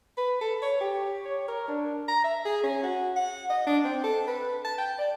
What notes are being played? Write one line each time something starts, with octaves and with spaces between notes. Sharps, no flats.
B4
A4
C#5
G4
C#5
A#4
D4
A#5
E5
G#4
C#4
F#4
F#5
D#5
D4
C4
A4
B4
A5
G5
D5